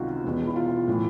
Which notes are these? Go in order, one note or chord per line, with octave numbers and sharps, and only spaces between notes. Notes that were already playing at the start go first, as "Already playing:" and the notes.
Already playing: C#2 C3 D#3 F4 F#4
E1 E2 B2
E4
F4
A2 E3